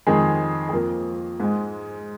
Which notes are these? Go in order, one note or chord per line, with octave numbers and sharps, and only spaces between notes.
F2 D#3 G#3 G#4
G#4
F2 F3 A#3 A#4
G#2 G#3